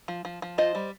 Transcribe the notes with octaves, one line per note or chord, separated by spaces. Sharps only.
F3
F3
F3
F4 C5 D#5
G3